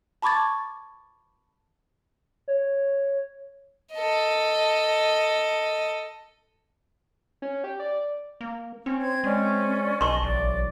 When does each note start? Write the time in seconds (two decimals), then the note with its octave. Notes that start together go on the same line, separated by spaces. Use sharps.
0.22 A5 B5 C#6 D6 G#6 A6
2.48 C#5
3.94 A4 D#5
7.42 C#4
7.64 G4
7.79 D5
8.41 A#3
8.86 C4 C#4
9.02 C5 G#6
9.24 G#3 C#4 C5 D5
10.01 B1 D#5 G#5 A5 C6 C#6
10.22 A1 D5